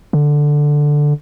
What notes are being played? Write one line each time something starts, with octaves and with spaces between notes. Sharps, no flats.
D3